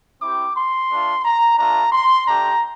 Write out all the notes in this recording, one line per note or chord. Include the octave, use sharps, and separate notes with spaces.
C4 E4 G4 D6
C6
A3 D4 F4
A#5
A3 D4 F4 A#5
C6
A3 D4 G4 A#5